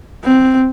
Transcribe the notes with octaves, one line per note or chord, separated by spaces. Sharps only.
C4